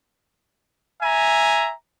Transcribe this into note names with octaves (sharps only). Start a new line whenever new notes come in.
E5 G#5 A#5